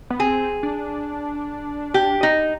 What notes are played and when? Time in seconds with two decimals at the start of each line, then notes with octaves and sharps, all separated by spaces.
0.10 B3
0.19 C4 G#4
0.63 D4
1.94 G4
2.23 D#4